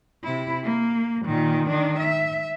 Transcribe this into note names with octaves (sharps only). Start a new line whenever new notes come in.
C3 E4
A#3
A#2 D#3
D#3 D4
E5